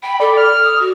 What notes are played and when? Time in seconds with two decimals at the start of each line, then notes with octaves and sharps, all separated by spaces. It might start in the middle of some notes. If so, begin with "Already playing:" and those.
0.02 G5 B5
0.20 A4 D5
0.37 F6
0.63 D#6
0.79 F#4